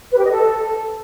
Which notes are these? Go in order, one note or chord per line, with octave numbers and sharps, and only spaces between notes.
B4
G4
D#5
A4